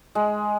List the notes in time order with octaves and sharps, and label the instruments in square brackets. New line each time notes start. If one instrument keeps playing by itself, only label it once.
[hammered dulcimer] G#3